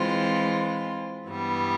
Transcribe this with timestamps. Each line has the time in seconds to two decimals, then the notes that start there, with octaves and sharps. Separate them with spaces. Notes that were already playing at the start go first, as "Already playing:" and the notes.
Already playing: E3 G#3 C4 F4
1.28 G2 E3 G3 B3